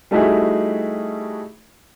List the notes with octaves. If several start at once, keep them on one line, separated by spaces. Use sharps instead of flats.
G3 A3 D#4 E4 F#4 G#4